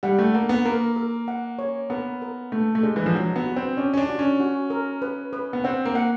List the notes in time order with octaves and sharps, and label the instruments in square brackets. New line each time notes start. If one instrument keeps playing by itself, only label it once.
[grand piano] G3 [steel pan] F#5
[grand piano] A3
[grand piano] A#3 [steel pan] F#5
[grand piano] B3
[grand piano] A#3 [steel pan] A#4
[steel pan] A#4
F#5
C#5
[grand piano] B3 [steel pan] A#4
[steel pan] A#4
[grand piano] A3 [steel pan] A#4
[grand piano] A3
[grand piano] G#3 [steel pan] D5
[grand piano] E3
F3
[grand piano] F#3 [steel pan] F#4
[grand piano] B3
[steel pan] F#4
[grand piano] C4
[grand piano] C#4 [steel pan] D5
[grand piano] C#4
D4
[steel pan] F#4
[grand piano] C#4
[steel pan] F#4
A#4
B4
B4
[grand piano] B3
[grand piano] C4 [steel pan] F#5
[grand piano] A#3
[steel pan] F#5